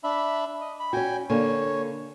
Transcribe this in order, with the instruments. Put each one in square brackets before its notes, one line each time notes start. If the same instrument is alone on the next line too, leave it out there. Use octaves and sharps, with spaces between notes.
[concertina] D4 E5 B5
D#5
B5
[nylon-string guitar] C#4 F#4 [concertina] G5 G#5
[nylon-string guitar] D3 A#3 G#5 [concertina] C#5